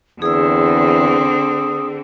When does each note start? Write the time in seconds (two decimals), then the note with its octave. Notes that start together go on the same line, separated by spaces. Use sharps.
0.22 E2 D3 C4 G#4 D#6 E6